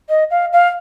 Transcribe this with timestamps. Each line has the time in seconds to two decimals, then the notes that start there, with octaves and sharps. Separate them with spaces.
0.09 D#5
0.31 F5
0.53 F5